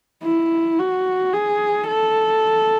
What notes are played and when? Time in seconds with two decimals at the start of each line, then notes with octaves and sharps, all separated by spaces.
0.23 E4
0.79 F#4
1.33 G#4
1.87 A4